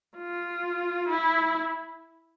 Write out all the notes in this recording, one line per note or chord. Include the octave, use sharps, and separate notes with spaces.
F4
E4